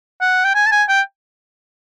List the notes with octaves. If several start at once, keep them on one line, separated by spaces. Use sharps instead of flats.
F#5
G5
G#5
A5
G#5
G5